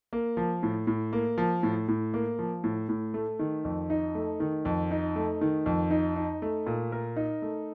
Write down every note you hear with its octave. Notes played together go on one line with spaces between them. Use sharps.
A#3
F3
A2
A2
A#3
F3
A2
A2
A#3
F3
A2
A2
A3
D#3
F2
D#4
A3
D#3
F2
D#4
A3
D#3
F2
D#4
D#4
A3
A#2
A#4
D#4
A3